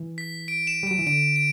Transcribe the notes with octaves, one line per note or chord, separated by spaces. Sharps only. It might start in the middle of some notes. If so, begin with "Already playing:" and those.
Already playing: E3
B6
D7
E7
G3
F#3 D7
E3
D3 D7
D7